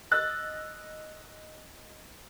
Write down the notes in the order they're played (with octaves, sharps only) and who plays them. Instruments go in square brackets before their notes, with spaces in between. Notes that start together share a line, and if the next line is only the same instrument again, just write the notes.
[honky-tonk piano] D#5 E6 F#6 A6